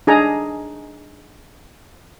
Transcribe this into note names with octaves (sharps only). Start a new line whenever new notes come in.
D4 D#4 G#4 G#5 A#5